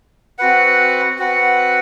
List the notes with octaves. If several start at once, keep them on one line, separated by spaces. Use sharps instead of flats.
C4 F#4 B4 F#5
C4 F#4 B4 F#5